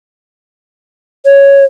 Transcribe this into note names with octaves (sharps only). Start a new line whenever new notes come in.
C#5